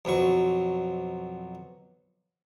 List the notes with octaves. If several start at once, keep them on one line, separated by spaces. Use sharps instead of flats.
B1 F2 F#3 C#6